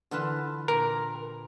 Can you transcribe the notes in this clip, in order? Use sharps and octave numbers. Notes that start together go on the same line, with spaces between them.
D3 E3 F4 B4 A5
A#2 A#4